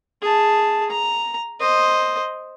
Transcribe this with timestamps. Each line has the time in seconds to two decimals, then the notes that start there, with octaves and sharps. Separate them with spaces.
0.22 G#4 A5
0.90 A#5
1.60 C5 D#5